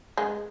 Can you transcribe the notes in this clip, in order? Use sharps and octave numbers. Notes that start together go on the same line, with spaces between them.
G#3